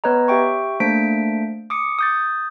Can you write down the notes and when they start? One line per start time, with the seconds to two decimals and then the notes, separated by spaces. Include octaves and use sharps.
0.04 B3 B4 C#5 D#5 A#5
0.28 G4 E5 G5 C#6
0.80 A3 A#3 D4 C5 B6 D7
1.70 D6 D#6 C#7
1.99 D#6 G6 A6